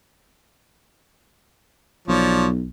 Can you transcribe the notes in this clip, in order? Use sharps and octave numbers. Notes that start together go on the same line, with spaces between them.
B1 F3 C#5 D5